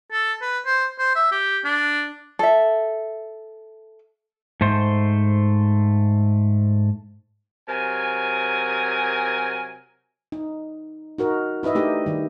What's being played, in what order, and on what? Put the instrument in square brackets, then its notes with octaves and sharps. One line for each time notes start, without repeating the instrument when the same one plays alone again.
[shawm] A4
B4
C5
C5
E5
G4
D4
[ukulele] A4 E5
[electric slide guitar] G#2 A3 C5
[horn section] C3 F#3 A#4 G#5
[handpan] D#4
D#4 F#4 A#4
D#4 E4 B4 D#5 E5
A3 D4 D#4 G4
D#3 G3